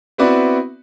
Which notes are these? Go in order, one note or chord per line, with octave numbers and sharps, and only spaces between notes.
B3 C4 E4 F#4 B4 D5